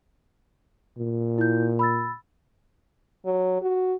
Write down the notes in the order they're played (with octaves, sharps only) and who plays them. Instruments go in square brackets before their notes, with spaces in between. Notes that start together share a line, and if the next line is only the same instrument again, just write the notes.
[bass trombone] A#2
[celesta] E4 G6
B5 E6 A6
[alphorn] F#3
F#4